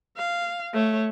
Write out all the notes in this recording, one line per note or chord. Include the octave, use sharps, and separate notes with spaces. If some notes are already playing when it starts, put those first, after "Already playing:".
F5
A3 C#5